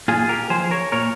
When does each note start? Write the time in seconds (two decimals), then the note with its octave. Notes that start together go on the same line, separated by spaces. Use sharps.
0.08 A#2 F4 G#4
0.29 G4 A#4
0.50 F3 G#4 C5
0.71 A#4 C#5
0.92 A#2 A#4 C#5